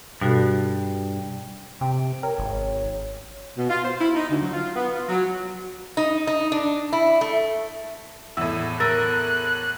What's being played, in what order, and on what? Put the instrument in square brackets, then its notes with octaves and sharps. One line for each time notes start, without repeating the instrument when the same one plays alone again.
[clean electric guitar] G2 [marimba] B2 F#4 A4
[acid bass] C3 [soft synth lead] G5
[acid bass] A#4 [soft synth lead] C#5
[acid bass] G#1
[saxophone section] B2
F4
C5
E4
D#4
D2
F#3
F4
B3
F4
F#3
[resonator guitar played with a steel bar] D#4
D#4
D4
E4
A3
[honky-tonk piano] E2 A2 [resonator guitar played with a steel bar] E4 [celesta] E6
[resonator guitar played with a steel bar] A#4 [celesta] E6 A6 [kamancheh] F#6